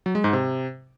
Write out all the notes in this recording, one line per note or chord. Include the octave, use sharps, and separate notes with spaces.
F#3
G#3
G#2
C3